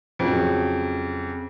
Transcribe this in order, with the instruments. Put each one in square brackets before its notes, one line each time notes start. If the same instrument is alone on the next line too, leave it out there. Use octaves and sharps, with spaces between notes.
[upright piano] F2 C#3 F#3